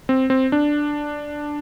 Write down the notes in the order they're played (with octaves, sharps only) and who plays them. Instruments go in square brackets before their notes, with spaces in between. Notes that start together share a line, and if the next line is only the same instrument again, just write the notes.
[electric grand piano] C4
C4
D4